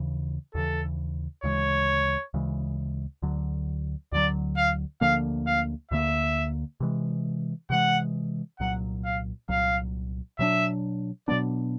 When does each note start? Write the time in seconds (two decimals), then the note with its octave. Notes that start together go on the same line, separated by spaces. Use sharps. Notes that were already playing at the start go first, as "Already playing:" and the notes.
Already playing: D#2 C#3 E3
0.54 D#2 C#3 E3 A4
1.44 D2 C#3 E3 G#3 C#5
2.34 D2 C#3 E3 G#3
3.22 D2 D3 F#3
4.12 D2 D3 F#3 D5
4.57 F5
5.01 D2 D3 F3 A#3 F5
5.47 F5
5.91 D2 D3 F3 A#3 E5
6.80 C3 E3 G#3
7.70 C3 E3 G#3 F#5
8.60 C2 A#2 F#3 F#5
9.04 F5
9.49 C2 A#2 F#3 F5
10.39 B2 F#3 B3 D4 E5
11.28 B2 F#3 B3 D4 D5